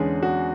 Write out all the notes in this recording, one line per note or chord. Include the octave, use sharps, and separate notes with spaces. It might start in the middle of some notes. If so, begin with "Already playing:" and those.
Already playing: E2 D3 G#3 C#4 G#4
F#4